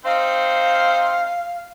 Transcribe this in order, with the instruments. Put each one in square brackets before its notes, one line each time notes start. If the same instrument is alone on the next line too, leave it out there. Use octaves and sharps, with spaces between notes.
[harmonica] C4 D#4 C5 [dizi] F5